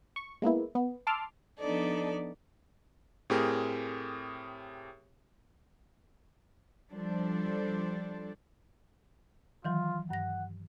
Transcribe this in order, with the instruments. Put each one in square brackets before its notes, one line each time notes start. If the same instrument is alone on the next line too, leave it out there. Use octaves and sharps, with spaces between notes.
[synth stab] C#6
G#3 A#3 B3 E4
B3
A5 C6 D6 E6 F6
[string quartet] F3 B3 D4 D#4 A4 D5
[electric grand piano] A2 C4 G4 G#4 A#4
[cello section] F3 G3 D4 A4 C5
[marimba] D#3 E3 F#3 [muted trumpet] F4
[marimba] G2 A#6 [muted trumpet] F#5